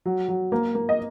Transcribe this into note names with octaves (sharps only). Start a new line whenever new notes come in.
F#3
F#3
A#3
A#3
D#5